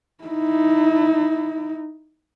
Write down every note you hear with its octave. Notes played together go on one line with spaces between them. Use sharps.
D#4 E4